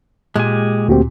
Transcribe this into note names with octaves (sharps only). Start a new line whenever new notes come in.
A#2 G#3 G4 G#5
D2 A#3 C4 F#4 G4